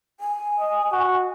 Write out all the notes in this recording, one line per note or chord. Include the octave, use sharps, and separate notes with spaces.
G#5
D#5
F#4